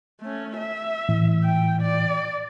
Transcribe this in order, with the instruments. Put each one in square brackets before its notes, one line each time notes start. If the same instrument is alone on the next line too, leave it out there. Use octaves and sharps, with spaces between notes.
[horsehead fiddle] A3 C#4
E5
[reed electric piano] A2 E3
[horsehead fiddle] G5
D5